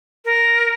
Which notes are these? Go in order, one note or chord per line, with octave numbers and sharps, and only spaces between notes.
A#4